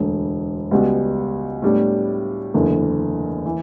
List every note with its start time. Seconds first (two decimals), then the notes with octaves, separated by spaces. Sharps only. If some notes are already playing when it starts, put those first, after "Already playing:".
Already playing: E1 D2 D3
0.71 C#2 C#3 G3 B3 F#4
1.62 A2 G3 B3 D4
2.54 F#1 E2 D3 A3
3.45 E3